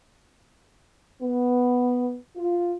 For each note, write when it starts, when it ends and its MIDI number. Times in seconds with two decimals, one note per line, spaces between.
1.22 2.15 59
2.36 2.75 65